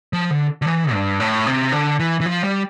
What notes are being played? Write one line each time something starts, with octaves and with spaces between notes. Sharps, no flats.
F3
D3
D3
E3
G2
A2
C3
D3
E3
E3
F3
G3